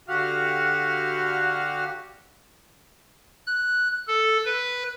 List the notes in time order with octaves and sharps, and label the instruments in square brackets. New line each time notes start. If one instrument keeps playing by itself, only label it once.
[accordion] D3 F#4 G4 F5 F#5 F6
[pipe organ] F#6
A4
B4